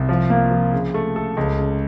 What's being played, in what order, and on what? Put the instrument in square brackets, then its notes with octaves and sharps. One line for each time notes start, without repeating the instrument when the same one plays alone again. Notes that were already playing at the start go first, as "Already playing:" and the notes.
Already playing: [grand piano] C2 C3
F3
A#3
F3
C#3
A3
A4
C#2
C#3